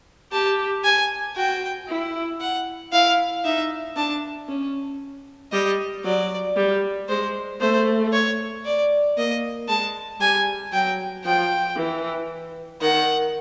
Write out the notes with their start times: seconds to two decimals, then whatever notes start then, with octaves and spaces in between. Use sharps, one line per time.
0.32 G4 A5
0.84 G#5
1.36 F#4 G5
1.88 E4
2.40 F#5
2.92 E4 F5
3.44 D#4 E5
3.96 D4 A5
4.48 C#4
5.52 G3 D#5
6.05 F#3 D5
6.56 G3
7.09 G#3 C5
7.61 A3 C5
8.13 C#5
8.65 D5
9.17 A#3 D#5
9.68 G#3 A5
10.20 G3 G#5
10.73 F#3 G5
11.25 F3 G5
11.77 E3
12.81 D#3 F#5